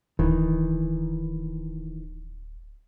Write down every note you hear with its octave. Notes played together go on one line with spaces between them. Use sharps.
D1 D#3 E3